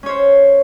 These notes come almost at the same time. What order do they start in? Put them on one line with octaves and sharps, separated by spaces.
C#4 C#5 C5